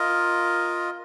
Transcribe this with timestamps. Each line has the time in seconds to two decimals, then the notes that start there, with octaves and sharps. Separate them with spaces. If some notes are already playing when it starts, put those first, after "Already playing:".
Already playing: F4 A#4 D#5